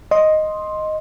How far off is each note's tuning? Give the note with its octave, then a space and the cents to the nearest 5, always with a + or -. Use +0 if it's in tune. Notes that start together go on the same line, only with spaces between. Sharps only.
D#5 +0 C6 +10